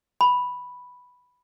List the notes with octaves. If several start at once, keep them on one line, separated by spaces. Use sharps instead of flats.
B5